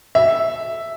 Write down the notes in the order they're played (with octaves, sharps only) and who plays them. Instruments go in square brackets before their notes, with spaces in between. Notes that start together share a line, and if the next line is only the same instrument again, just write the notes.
[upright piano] E5